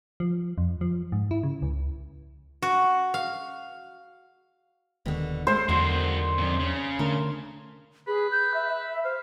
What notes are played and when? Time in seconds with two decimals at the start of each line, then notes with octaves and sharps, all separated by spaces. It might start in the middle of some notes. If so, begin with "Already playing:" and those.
0.20 F3
0.58 F2
0.81 F3
1.12 G#2
1.31 E4
1.43 C#3
1.62 C#2
2.62 F#4
3.14 F5
5.06 D#1 D#2 B2 D3 D#3
5.47 G#3 A3 C5
5.69 E2 D3 D#3 F#3 G#3 A#3 F#4
6.38 F2 A#2
6.59 C#3
6.99 D3 A3 D4 A#4
8.07 G#4 B4
8.32 G6
8.54 E5
8.68 E5
9.04 C5 F5